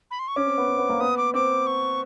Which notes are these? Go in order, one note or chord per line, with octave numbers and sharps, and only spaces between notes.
B5
C6
C#6
C#4 D6
C4
B3
C4
B3
A#3
B3 D#6
D6
C4 D6
C#6